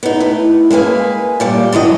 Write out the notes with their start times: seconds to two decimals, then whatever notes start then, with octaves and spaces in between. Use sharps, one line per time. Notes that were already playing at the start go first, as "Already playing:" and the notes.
0.03 B3 D#4
0.20 A2
0.71 G#3 A#3 B4 G#5
1.40 A#2 G3 D5
1.73 D3 E3 F#3 D#5